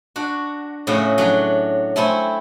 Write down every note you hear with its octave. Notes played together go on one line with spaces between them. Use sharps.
D4 F#4
A2 C#3 F#4 E5
F#3 D4 F#4
A3 C4 E4 G#5